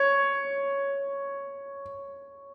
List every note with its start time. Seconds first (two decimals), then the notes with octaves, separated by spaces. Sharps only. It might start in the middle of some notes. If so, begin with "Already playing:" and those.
Already playing: C#5